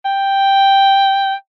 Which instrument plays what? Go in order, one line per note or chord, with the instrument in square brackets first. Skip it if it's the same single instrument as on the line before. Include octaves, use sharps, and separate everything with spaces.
[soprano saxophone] G5